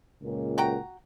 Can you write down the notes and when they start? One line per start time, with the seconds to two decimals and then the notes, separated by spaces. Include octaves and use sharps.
0.22 C#2 A#2
0.58 F#4 G5 A#5